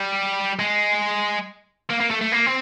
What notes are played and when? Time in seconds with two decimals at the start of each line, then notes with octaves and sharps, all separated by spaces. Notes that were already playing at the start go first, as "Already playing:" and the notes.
Already playing: G3
0.59 G#3
1.90 A#3
2.00 A#3
2.10 A3
2.21 A3
2.32 A#3
2.46 C4